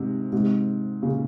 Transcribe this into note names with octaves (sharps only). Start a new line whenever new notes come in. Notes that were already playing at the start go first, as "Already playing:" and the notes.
Already playing: G#2 C3
G#2 C3
A#2 C#3